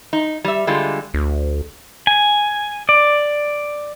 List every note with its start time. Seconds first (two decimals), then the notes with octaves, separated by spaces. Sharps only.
0.13 D#4
0.44 G3 E5
0.67 D3 G3 G#3 F4
1.14 D2
2.07 G#5
2.89 D5